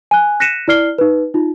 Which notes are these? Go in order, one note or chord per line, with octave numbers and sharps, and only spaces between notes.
G#5 F#6
F#6 A#6 B6 C#7 D#7 E7
E4 D5 F6 C7 G7
D#4 B4
D#4 F4